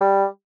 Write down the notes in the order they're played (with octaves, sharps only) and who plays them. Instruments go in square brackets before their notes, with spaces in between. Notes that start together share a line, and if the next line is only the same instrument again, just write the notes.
[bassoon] G3